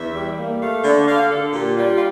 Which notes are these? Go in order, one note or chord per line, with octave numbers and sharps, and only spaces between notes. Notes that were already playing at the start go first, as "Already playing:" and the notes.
Already playing: E2 E5
G3
A#3
A3 F5
D3
D3 F5
D3 A4
A#2 G4
G3 F4
F4